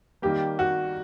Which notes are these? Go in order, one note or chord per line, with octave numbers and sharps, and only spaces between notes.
D#3 G3 A#3 G4
F#4